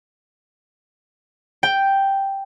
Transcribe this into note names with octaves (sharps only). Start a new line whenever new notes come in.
G5